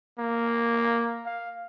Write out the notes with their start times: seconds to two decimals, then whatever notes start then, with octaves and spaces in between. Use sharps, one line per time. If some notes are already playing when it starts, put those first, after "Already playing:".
0.19 A#3
1.26 F5